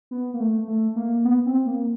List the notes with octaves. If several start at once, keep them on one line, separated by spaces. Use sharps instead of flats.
B3
A#3
A3
A3
A#3
B3
C4
A#3